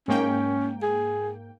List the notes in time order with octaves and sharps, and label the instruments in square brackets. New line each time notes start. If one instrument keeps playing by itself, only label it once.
[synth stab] G#2 A#3 G5 [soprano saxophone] C#4
[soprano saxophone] G#4